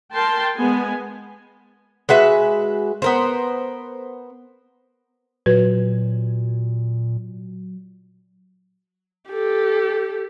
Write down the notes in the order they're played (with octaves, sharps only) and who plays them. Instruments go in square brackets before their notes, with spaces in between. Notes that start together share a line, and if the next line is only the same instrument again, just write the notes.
[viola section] A#4 G5 A5 C6
G#3 B3 G#5
[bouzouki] G#3 F#4 B4 E5
B3 A#4 C5
[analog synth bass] A#2 [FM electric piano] F#3 [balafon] B4
[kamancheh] G4 A4